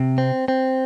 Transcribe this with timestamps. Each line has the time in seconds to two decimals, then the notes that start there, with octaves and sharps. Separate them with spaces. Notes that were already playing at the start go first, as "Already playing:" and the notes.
Already playing: C3
0.18 C4
0.48 C4